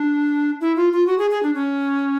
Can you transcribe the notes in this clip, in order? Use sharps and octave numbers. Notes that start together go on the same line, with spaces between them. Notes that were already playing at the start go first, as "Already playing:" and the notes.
Already playing: D4
E4
F4
F4
F#4
G#4
G#4
D4
C#4